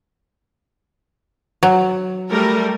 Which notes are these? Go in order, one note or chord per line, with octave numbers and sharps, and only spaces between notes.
F#3
G3 A3 A#4